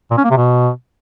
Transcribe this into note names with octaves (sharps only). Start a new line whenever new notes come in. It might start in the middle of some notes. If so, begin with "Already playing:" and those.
A#2
C#4
A#3
C3
B2